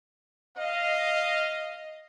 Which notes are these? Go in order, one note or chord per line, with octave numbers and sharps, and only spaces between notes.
D#5 F5